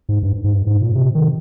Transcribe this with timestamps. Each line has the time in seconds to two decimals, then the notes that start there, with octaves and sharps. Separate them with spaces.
0.09 G#2
0.23 G2
0.44 G#2
0.52 G2
0.67 G#2
0.81 A#2
0.95 C3
1.15 D#3